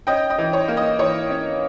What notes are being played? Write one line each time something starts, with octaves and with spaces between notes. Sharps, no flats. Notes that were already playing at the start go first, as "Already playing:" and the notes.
C#4 D#5 G5
D#5
E3
C#5
A#3
D#5
E3 C#5
C#4